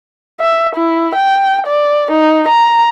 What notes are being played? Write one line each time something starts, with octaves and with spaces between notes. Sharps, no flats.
E5
E4
G5
D5
D#4
A#5